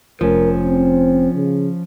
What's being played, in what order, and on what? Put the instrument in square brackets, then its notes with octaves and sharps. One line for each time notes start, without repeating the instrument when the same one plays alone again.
[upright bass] F1 [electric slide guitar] F3 C#4 [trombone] A#4
[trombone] C4
C#3